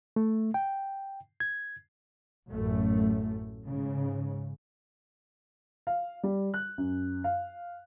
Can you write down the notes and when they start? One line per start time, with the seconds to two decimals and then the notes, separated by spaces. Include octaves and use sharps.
0.16 A3
0.54 G5
1.40 G#6
2.49 A1 F#2 A3
3.65 G#2 C#3
5.87 F5
6.23 G3
6.54 F#6
6.78 F#2
7.24 F5